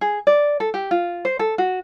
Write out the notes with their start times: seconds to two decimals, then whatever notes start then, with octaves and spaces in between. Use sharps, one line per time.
0.01 G#4
0.27 D5
0.60 A4
0.74 G4
0.91 F4
1.25 C5
1.39 A4
1.58 F#4